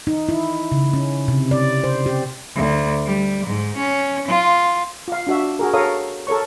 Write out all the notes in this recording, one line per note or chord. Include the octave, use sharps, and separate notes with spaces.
D#4
E4
C#3
C#4
C3
D5
C5
G4
D2
G3
G#2
C#4
F4
F4 F5
D4 F#4 E5
F#4 G#4 A#4
A4 A#4 C#5 F5 D#6
A4 A#4 C#5 C#6